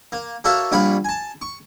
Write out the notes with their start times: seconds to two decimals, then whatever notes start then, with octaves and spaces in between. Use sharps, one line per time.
0.12 A#3
0.44 A#3 F#4 A4 C#5 E5 F5
0.72 A#1 G3 C#5 F5 B5 C#6
1.05 G#5 A5
1.42 C#6